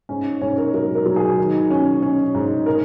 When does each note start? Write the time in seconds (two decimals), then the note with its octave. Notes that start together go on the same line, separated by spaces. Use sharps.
0.09 G#2 C#4 C#5
0.41 G#2 C#4 C#5
0.58 A#4
0.74 F#3 A#4
0.95 A#4
1.06 F#3
1.16 G#4
1.38 D#3
1.70 C#4
2.02 C#4
2.35 G#2
2.66 A#4